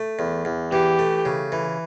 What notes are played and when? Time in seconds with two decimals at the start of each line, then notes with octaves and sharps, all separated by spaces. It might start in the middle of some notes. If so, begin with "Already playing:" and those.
Already playing: A3
0.19 E2
0.45 E2
0.72 E3 G4
0.99 A3
1.25 C#3
1.52 E3